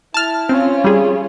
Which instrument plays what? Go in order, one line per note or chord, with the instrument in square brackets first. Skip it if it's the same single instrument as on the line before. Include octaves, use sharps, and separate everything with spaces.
[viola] E4 [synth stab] A5 F6
[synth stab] C4 [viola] C#4 F4
[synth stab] G3 G#4